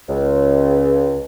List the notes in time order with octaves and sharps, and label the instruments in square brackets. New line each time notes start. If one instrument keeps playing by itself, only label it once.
[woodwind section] C#2